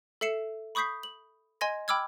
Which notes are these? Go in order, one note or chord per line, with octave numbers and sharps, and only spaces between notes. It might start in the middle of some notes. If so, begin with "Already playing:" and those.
A4 E5 C7 C#7 E7
B5 C#6 D#6 G6 B6 C7
F#7
D#5 G#5 C6 G#6 A#6
G5 B5 D6 E6 F6 G#6